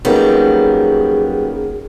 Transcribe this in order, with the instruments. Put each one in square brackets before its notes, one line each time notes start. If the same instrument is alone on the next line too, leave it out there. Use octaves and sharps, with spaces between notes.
[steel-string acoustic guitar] F#3 G3 B3 [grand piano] A#3 C#4 D#4 [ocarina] G#4